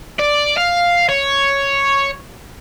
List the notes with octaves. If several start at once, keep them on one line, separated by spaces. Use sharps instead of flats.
D5
F5
C#5